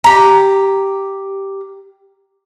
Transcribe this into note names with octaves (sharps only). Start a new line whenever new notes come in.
G4 A#5